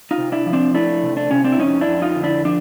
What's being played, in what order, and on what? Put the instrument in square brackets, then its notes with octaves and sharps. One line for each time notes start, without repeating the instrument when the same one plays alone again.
[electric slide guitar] D#4 F4
C3
D4 E4
F3
C4 D4
A3 D4 E4
C3
D4
C3 C#4
C4 D4
E4
F2 C#4 D#4
D4 E4
F2
D#4 F4
D3
D4 E4
F3 D4